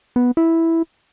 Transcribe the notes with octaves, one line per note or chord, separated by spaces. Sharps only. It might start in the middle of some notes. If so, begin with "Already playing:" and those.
B3
E4